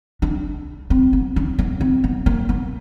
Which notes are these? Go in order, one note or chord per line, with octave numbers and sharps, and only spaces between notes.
D4
C4
B3
C#4
B3
C4
B3
A#3
B3